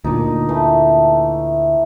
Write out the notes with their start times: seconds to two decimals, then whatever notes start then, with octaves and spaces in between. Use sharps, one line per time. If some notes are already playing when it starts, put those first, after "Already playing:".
0.05 D2 A#2 D#4 D5
0.49 E3 A3